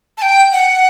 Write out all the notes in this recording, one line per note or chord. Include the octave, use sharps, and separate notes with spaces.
A5
G5
F#5